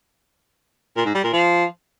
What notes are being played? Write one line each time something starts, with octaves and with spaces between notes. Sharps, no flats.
A#2
G#2
G3
A#2
F3